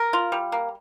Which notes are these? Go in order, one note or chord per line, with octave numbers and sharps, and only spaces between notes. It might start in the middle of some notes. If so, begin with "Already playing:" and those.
Already playing: A#4
F4
G3
A#3